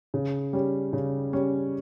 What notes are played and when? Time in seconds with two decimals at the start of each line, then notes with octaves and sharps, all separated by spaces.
0.14 C#3
0.53 G3 C#4
0.93 C#3
1.33 G3 C#4